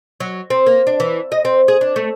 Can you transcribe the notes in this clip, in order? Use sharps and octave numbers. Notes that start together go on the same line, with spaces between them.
F#3
C4
A#3
D4
E3
D#5
C4
G#4
D4
A3